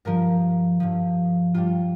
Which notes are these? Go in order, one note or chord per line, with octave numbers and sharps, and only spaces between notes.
G2 F3 A#4
G2 F3
G2 G3 F4